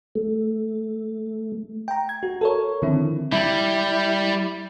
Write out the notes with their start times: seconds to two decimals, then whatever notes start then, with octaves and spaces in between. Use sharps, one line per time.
0.15 A3
1.88 G5 A#5
2.09 G#6
2.23 F#4
2.41 A4 A#4 C#5
2.82 D3 D#3 F3 C4 E4
3.32 G3 E4